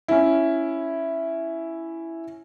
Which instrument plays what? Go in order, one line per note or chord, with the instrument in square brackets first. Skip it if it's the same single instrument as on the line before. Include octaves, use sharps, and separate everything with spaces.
[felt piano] C#4 E4